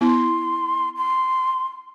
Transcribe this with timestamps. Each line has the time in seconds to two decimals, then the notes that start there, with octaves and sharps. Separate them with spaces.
0.01 B3 E4 C6
0.96 C6